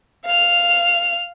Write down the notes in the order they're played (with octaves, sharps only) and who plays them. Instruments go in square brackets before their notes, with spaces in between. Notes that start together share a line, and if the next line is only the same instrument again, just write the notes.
[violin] F5 F7